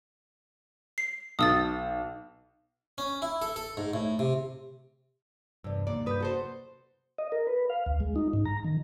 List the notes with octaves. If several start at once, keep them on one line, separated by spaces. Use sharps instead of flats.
C7
B1 D#6 E6 A6
C#4
E4
A4
A4
G#2
A2
C3
E2 G2 C3 D5
D#2 G#2 A#3 D5
G2 B4 D#6 G6
F#4 A4 C5
D#5
A#4
B4
F5
D2
G#3
D#4
G#2
A#5
D#3